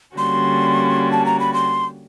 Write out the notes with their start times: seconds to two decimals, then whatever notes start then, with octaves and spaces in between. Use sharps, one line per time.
0.17 D3 G3 A#3 C#4 F#4 C6
1.12 A5
1.26 A#5
1.40 B5
1.53 C6